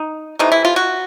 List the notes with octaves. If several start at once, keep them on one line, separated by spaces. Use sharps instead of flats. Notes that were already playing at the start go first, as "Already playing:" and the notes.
Already playing: D#4
C3 E3 A3 D#4
E4
F4
F#4